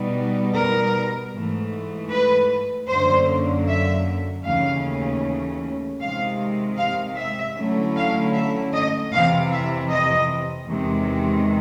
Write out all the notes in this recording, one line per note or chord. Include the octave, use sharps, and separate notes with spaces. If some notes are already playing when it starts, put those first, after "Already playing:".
Already playing: B2 G3 B3 D#4
A#4
G#2 E3 A3
B4
F#2 D3 F#3 A#3 C5
E5
D#2 C#3 E3 A3 C#4 F5
C3 D#3 G#3 F5
F5
E5
D3 F#3 A3 C#4 E4
F5
E5
D#5
F2 C3 E3 F5
E5
D#5
E2 C3 D#3 G#3 C4